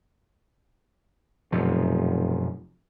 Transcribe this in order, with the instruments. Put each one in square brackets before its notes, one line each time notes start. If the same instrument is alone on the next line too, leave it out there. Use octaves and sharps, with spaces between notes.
[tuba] F1 [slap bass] F#2 B2 F3